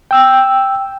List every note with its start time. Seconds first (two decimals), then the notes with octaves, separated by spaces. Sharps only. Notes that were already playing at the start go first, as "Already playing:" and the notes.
0.11 G5 E6